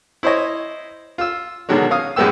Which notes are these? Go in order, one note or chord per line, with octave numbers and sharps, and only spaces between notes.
E4 C5 C#5 D#5
F4 E6
B2 D3 D#3 F#3 G#3
C#4 F5 D#6
F#2 A2 G#3 B3 G4 E6